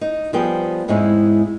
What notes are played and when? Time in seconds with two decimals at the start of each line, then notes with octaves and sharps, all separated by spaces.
0.01 D#4
0.33 F3 G3 B3 G#4 G5
0.88 E2 G#2 G#3 C4 C#4 E4